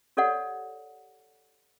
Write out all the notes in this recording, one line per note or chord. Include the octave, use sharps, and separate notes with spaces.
G4 A4 C#5 D5 F#5